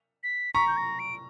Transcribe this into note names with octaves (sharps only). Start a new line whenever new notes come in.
B6
A#5 C#6 B6
G6
A#6
D7